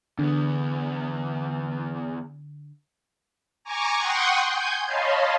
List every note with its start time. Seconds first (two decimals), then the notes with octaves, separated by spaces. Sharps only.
0.19 E2 D3 B3
3.64 G#5 A#5 C#6 D6
3.98 F#5 G5 C6 C#6 D#6
4.50 G#5 G6 G#6
4.86 C#5 D#5 F5 A5 B5 C6